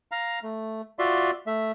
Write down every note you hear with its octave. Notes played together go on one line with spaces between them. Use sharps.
F5 A#5
A3
F4 F#4 D5 E5 C6
A3 E5